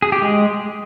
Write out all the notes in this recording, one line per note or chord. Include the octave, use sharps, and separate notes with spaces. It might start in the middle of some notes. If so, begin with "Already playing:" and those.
G#4
G4
G#3